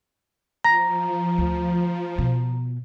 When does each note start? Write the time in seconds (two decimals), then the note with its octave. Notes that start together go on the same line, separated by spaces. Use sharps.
0.64 F3 A#5 A#6
1.38 D2
2.18 B2